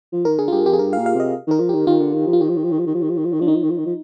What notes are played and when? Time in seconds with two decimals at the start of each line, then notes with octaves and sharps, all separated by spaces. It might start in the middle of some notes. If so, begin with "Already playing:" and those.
0.12 F3
0.25 D#3 A#4
0.39 D3 G#4
0.48 F4
0.52 G2 G4
0.66 F2 G4
0.73 G#4
0.79 G2 A#4
0.93 F5
0.98 A#2
1.06 F5
1.15 C3 D#5
1.47 D#3 A#4
1.60 F3
1.69 D#3 G4
1.87 D#3 F4
2.00 D3
2.14 D#3
2.27 F3
2.33 F4
2.41 D#3 G4
2.49 F3
2.57 D#3
2.64 F3
2.72 D#3
2.79 F3
2.86 D#3
2.94 F3
3.02 D#3
3.09 F3
3.17 D#3
3.25 F3
3.32 D#3
3.40 F3 D4
3.47 D#3 D#4
3.55 F3
3.63 D#3
3.70 F3
3.78 D#3
3.86 F3